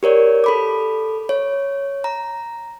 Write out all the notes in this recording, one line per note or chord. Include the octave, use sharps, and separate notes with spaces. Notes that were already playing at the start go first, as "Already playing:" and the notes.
G4 A#4 C#5 D5
A4 B5 D6
C#5
A#5